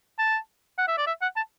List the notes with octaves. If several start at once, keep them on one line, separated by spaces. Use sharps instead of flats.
A5
F#5
E5
D5
E5
F#5
A5